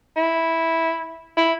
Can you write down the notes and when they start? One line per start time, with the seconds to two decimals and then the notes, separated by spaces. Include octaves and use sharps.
0.16 E4
1.37 E4